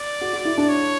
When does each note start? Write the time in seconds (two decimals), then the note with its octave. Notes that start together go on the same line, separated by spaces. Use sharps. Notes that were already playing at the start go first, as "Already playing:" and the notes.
Already playing: D5
0.21 F#4
0.33 F#4
0.45 E4
0.58 D4
0.69 C#5